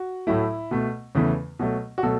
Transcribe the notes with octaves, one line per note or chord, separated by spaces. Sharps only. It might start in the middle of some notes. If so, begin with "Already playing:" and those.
Already playing: F#4
A2 F#3 A3 E4
B2 A3
E2 C#3 E3 A3
B2 F#3 A3
F#4
B2 F#3 A3 A4